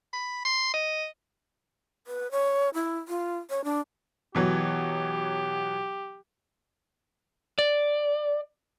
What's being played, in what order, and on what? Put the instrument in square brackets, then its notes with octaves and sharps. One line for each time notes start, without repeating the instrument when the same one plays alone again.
[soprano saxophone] B5
C6
D#5
[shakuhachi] B4
C#5
E4
F4
C#5
D4
[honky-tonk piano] B2 E3 F#3 [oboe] G4
[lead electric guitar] D5